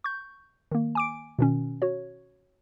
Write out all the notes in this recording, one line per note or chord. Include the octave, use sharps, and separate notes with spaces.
C#6 G6
D#3 A#3
G#5 D6 D7
B2 D#3 C#4
F#4 C#5